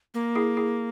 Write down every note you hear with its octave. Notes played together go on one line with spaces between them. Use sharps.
A#3
E4 G#4
E4 G#4